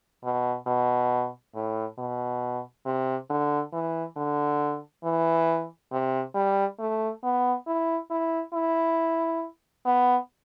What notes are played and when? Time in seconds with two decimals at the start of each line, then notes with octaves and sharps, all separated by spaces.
0.24 B2
0.66 B2
1.55 A2
1.98 B2
2.86 C3
3.30 D3
3.73 E3
4.16 D3
5.04 E3
5.92 C3
6.35 G3
6.79 A3
7.23 B3
7.67 E4
8.10 E4
8.53 E4
9.85 B3